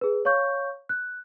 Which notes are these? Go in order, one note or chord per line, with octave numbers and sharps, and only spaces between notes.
G#4 B4
C#5 F5 C#6 G6
F#6